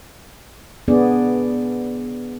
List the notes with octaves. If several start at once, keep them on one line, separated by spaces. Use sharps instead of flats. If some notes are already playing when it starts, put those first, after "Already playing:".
B3 D4 G#4 D5